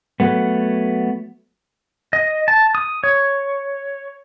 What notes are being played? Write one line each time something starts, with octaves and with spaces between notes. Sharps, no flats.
F#3 A3 B3
D#5
A5
D#6
C#5